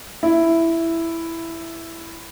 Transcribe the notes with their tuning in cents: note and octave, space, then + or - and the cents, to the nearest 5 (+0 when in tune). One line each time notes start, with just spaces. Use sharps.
E4 +5